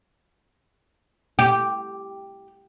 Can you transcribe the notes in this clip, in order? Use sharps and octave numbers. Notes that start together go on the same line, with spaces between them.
G4